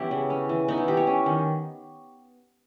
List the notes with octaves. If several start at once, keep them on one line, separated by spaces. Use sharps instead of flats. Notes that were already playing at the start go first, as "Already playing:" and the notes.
Already playing: E3 B3 C#4 E4 G4
C#3
C#4
E3
B3 D#4
E4
E3 G4
C#5
C#4
D#3